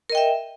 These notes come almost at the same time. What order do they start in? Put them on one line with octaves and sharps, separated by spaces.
A#4 D#5 G5 E5